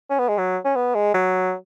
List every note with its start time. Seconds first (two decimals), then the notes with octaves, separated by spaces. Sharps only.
0.10 C#4
0.19 B3
0.29 G#3
0.38 F#3
0.65 C#4
0.76 B3
0.95 G#3
1.14 F#3